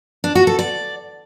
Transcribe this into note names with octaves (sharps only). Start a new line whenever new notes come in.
D4
F#4
A4
D5